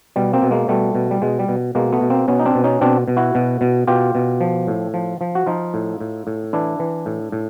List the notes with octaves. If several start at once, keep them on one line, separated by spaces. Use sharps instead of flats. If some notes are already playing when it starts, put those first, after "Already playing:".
B2 G3
A#3 C4
B2
G#3 A#3
B2 G3 A3
B2
G3
B2 G#3
G3
B2
B2 G#3 A#3
A3 B3
B2
A#3 C4
B2 B3 C#4
D#4
C4 D4
B2
C#4 D#4
B2 C4 D4
B2
E4 F#4
B2
B2
B2 F4 G4
B2
F3
A2
F3
F3
F#4
F3 D#4 F4
A2
A2
A2
E3 D4 E4
E3
A2
A2